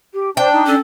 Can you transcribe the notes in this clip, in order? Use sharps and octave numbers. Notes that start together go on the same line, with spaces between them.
G4
D4 C5 G5
D#4
C#4 A4